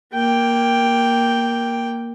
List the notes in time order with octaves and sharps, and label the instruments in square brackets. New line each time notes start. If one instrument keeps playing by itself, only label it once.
[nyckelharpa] A#3 G5